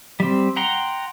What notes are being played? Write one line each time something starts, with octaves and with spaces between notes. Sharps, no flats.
G3 C4
F#5 G5 A#5 C6